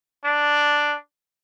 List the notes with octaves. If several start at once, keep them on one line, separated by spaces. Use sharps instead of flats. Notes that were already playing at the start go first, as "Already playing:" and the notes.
D4